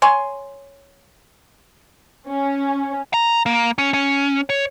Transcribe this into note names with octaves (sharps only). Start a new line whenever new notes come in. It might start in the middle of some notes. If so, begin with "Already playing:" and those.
C#5 G#5 C6
C#4
A#5
A#3
C#4
C#4
C#5